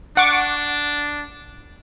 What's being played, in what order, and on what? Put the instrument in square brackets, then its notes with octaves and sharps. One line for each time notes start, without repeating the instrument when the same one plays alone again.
[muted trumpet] D4 [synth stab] F#5 C#6 D6